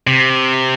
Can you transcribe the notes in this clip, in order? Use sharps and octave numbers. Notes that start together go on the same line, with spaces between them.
C3